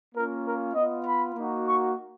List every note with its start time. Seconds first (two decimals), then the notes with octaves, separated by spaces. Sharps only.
0.14 A#3 C#4 F4 A#4
0.44 A#4
0.74 B3 F4 D#5
1.05 B5
1.35 A#3 D#4 F#4
1.65 C#6